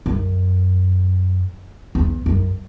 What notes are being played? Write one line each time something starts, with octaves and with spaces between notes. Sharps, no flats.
F#2
E2
F#2